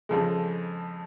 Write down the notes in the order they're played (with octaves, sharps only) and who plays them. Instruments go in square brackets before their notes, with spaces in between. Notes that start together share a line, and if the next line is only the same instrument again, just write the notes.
[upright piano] F2 C#3 F3 G#3